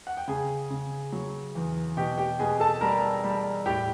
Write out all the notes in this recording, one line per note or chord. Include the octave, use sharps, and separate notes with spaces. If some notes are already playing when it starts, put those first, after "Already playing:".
F#5
G5
C#3 G#4 G#5
C#3
F#3
E2
B2 G4 G5
G4 G5
B2 G#4 G#5
A4 A5
G3 A#4 A#5
G3
A2 G4 G5